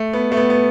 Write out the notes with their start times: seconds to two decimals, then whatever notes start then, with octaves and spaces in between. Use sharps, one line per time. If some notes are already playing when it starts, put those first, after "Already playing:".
Already playing: A3
0.13 B3
0.32 A3
0.37 B3
0.50 B3